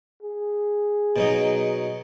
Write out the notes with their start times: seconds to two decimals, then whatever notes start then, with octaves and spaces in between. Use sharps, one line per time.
0.23 G#4
1.16 B2 F#3 D#4